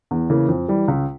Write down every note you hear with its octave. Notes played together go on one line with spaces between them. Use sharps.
E2
C#3 E3 A#3
F2
E3 G3
C#2